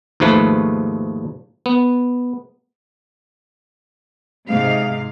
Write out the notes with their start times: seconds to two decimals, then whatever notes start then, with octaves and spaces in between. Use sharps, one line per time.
0.20 D#2 G#2 F3 A3 B4
1.66 B3
4.49 G#2 C3 F5